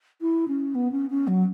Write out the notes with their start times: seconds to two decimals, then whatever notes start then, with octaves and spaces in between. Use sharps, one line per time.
0.21 E4
0.47 C#4
0.74 B3
0.91 C#4
1.10 C#4
1.27 F#3